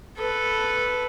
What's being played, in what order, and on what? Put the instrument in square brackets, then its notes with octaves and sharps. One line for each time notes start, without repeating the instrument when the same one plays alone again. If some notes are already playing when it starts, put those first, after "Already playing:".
[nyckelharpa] A4 B4